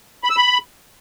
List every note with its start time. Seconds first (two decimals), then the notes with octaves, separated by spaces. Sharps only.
0.24 B5
0.30 E6
0.37 B5